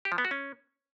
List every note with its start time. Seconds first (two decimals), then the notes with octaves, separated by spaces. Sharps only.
0.05 G4
0.12 F3
0.18 B3
0.25 F#4
0.31 C#4